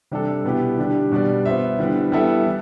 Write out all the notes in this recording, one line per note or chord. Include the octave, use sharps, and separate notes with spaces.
C3 G3 D4 A4
B2 B3 E4 G4
D3 G3 D4 G4
B2 G3 D4 G4 D5
B3 F4 C5 E5
D3 G3 B3 E4
G3 B3 E4 A4 E5
E3